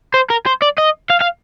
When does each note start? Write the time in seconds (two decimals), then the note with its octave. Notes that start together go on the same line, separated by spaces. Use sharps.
0.14 C5
0.30 A#4
0.46 C5
0.62 D5
0.78 D#5
1.10 F5
1.21 F5